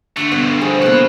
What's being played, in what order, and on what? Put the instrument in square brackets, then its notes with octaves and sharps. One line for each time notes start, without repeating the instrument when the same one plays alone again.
[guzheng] D3 F#4 C6 [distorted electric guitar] A3
[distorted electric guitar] G2 B2 [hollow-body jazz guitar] B3 [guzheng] D5
[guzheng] F3 [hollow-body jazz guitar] G#4
[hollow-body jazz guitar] C2 B2 A#3 [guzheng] G#3 A4 [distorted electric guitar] F#4 B4